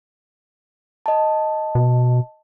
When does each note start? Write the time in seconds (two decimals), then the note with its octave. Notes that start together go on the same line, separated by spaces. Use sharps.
1.06 D#5 A5
1.75 B2